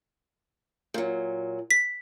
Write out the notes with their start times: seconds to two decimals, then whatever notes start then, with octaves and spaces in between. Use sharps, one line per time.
0.94 A#2 F#3
1.71 B6